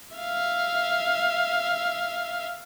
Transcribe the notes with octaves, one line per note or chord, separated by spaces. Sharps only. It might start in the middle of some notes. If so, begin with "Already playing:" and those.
E5 F5